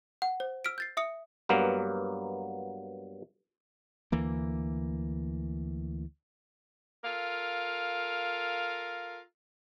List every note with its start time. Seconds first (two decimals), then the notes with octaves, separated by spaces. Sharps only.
0.22 F#5
0.40 C5
0.65 E6 F6 B6 D7
0.78 G6 A6 C7
0.97 E5 D#6 C#7
1.49 G2 F#3 A#3 B3
4.12 D2 E3 A#3
7.03 F4 A4 A#4 F5